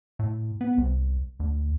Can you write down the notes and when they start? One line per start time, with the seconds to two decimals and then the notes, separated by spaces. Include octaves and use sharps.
0.19 A2
0.61 B3
0.78 C2
1.40 D2